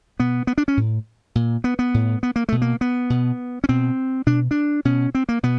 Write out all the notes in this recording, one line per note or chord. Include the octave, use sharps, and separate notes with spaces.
B2 B3
B3
D4
C#4
A2
A#2
B3
B3
A2
B3
A#3
B2 A3
A#3
B3
B2
C#4
B2 C4
B2 D4
D4
B2 C#4
C4
A#3
B2 B3